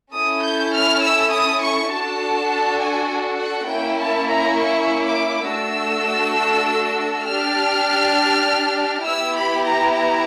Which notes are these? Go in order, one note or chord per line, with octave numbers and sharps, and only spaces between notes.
C#4 E4 A4 D#6
G6
F6
E6
D#6
C#6
D4 F#4 A4 A5
G#5
F#5
A#3 C#4 E4 G5
A5
A#5
C#6
D6
A3 D4 F#4 A4 E6
D4 G4 F6
B3 E4 G4 E6
B5
A#5
A#5